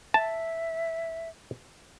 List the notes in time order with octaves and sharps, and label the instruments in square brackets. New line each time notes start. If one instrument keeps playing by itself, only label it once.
[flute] E5 [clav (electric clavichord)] A5